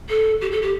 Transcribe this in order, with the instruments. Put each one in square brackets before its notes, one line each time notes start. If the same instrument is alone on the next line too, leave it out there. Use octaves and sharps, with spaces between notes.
[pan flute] A4
G4
A4
G4